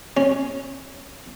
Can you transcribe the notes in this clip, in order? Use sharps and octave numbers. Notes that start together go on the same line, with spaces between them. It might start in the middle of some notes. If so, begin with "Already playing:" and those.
C#4